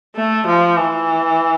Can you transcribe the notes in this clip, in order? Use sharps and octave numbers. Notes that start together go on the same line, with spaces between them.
A3
F3
E3